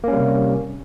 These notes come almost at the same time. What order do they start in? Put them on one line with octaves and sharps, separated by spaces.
A#3 C#4 G3 C3